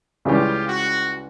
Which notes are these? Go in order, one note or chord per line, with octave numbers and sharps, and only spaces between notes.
C#2 C#3 E3 G3 F4 G4
F#4